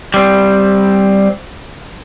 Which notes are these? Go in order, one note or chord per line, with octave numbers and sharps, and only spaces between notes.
G3 C4